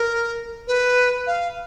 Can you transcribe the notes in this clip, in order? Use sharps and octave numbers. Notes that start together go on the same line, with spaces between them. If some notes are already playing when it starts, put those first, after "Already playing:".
Already playing: A#4
B4
F5